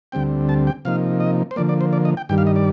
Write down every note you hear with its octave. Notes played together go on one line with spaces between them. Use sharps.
D2 D3 G3 C4 G5
A5
G5
C3 F3 A#3 D#4 F5
D#5
C5
D3 F3 A#3 D5
D5
C5
D5
D#5
G5
G2 D#3 G3 G5
F5
D#5
D5